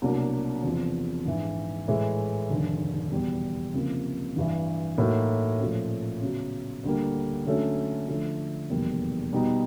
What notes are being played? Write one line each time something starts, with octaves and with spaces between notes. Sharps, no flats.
C2 B2 F#3 A#3 D4
E2 C3 F3
A#1 G#2 E3
A2 E3 G#3
F1 D#2 D3
E2 B2 G3
C#2 C3 F3 A#3
A1 G2 E3
A2 F#3 A#3 D#4 F#4
A#2 F3 A3 C#4
C#3 F#3 B3
D2 D3 G3 A#3
D3 F#3 A3 C#4
D3 F3 A3
F1 E2 B2 G3 A#3
B2 G3 B3 D#4